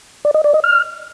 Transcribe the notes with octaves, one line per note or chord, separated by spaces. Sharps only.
D5
D#5
D5
D#5
F6